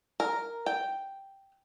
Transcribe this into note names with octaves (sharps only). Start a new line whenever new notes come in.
A#4
G5